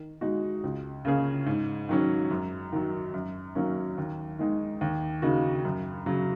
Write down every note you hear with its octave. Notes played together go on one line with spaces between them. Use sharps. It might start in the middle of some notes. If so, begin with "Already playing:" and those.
Already playing: D#3
G#3 D#4 F#4
C#2
C#3 A#3 C#4 G#4
G#2
D#3 F#3 C#4
F#2
D#3 F#3
F#2
D#3 F#3 A#3 C#4
D#2
D#3 G#3 D#4
D#2
C#3 A#3 D#4 F#4
F#2
C#3 F#3